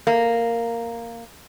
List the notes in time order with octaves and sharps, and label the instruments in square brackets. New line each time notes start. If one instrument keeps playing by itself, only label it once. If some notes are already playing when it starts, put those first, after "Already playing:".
[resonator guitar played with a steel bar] A#3